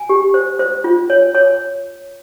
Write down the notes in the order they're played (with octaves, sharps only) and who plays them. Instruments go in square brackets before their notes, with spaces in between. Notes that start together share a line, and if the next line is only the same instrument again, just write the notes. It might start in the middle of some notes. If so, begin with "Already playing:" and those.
Already playing: [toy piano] G#5
G4
C5
C5
F4
C#5
C#5